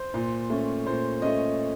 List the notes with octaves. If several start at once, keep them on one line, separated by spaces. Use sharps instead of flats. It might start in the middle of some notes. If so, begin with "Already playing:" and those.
Already playing: C5
A#2
A3 C#4
A#2 C5
A3 C#4 D#5